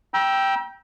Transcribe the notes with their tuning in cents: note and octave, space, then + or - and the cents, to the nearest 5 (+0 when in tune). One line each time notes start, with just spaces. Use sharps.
G5 +0 A#5 +40 E6 +0